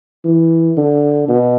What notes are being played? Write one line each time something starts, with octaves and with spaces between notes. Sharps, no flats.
E3
D3
B2